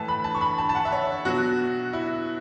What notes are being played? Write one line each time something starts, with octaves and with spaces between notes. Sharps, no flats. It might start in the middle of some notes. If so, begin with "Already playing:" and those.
Already playing: A2 E3 A5
B5
A5
C#6
B5
A5
A5
F#5
E5
C#5
B2 F#3 F#4
E4